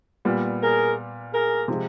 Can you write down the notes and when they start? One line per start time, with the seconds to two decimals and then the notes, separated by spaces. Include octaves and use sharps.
0.25 A#2 G3 B3
0.61 G#4 A#4
1.32 G#4 A#4
1.68 C3 F3 G#3